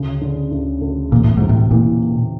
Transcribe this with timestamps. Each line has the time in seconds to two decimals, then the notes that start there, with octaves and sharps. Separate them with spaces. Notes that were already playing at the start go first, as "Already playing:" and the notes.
Already playing: D2 C#3
0.21 D3
0.51 D2
0.81 D2
1.12 E1 A#2
1.24 A2
1.37 G#2 C3
1.49 A2
1.71 A#2 E3